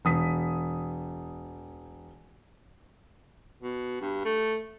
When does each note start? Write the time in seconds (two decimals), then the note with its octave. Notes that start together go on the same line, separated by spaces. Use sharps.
0.05 E1 D#6 B6
3.62 B2
4.01 G2
4.25 A3